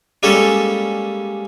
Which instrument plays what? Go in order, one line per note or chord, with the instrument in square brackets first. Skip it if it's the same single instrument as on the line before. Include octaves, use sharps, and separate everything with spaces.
[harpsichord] G3 G#3 A#3 C#4 A4